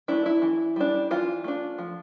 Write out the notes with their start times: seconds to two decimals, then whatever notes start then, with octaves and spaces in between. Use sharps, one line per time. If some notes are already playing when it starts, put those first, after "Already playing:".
0.08 A3 D4 E4
0.26 E4
0.42 E3
0.76 G3 D4
1.11 E3 F4
1.44 A3 D4
1.78 F3